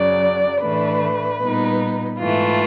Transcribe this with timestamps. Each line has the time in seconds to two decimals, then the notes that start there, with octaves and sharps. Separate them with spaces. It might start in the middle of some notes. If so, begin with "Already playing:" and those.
Already playing: F#2 C#3 F#3 D5
0.61 A2 E3 A3 D4 B4
1.41 A#2 G3 B3 D#4
2.19 G#2 E3 A3 F4